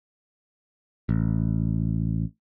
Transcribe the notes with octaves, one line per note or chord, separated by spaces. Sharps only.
A1